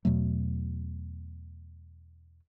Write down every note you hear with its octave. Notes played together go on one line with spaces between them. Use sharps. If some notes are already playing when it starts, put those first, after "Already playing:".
E2 B2 F#3 A3